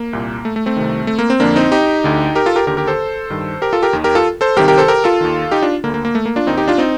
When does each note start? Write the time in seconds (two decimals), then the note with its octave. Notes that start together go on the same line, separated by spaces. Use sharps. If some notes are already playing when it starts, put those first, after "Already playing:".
Already playing: A#3
0.13 C2 A#2
0.45 A3
0.56 A3
0.66 A3 C4
0.77 C2 C3 D#3
1.07 A3
1.19 A#3
1.30 C4
1.40 F2 D3 A#3 D4
1.56 C4 D#4
1.72 D#4 G4
2.04 D2 D3
2.35 G4 A#4
2.46 F4 A4
2.56 G4 A#4
2.67 D#2 D3 G4 A#4
2.77 G4 A#4
2.87 A4 C5
3.30 G2 D#3
3.62 G4 A#4
3.73 F4 A4
3.82 G4 A#4
3.93 D#2 D#3
4.04 G4 A#4
4.15 F4 A4
4.41 A4 C5
4.56 C2 C3 D#3 G4 A#4
4.68 G4 A#4
4.78 A4 C5
4.88 G4 A#4
5.04 F4 A4
5.21 D#2 D#3
5.51 D#4 G4
5.62 D4 F4
5.84 D3 A#3
5.88 D2
5.94 A#3
6.05 A#3
6.15 A3
6.26 A#3
6.36 D4 F4
6.47 D#2 D#3 C4 D#4
6.57 D#4 G4
6.68 D4 F4
6.78 C4 D#4